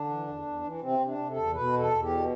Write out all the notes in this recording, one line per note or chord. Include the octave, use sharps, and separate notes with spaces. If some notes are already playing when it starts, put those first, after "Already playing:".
Already playing: D3 D4
E3
E2
E2
E3
C3 C4
C3
D4
C3
A4
E2
B2 B4
E2
A4
E2
G4
B2